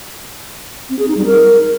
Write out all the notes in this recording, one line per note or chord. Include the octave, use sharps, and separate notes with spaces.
C4
G#4
D#4
G3
A#4